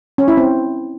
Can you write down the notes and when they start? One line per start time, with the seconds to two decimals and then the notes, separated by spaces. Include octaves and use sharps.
0.18 C#4
0.28 E4
0.37 C4